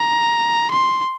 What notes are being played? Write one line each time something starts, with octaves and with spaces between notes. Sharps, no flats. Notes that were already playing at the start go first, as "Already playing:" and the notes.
Already playing: A#5
C6